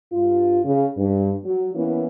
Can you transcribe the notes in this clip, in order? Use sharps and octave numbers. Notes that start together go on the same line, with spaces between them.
G2 F4
C#3
G2
F#3
E3 A#3 B3 C#4 E4